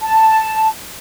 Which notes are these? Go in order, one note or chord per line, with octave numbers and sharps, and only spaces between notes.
A5